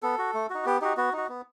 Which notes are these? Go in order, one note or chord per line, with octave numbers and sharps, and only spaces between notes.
B3 A4
F#4
A3
D#4 F#4
B3 G4
D#4 F#4 G4
B3 F#4
D#4 F#4
B3